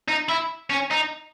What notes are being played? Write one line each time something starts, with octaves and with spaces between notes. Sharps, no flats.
D#4
E4
C#4
D#4